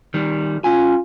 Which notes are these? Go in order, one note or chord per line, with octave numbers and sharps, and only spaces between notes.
D#3 G3
C#4 F4 G#5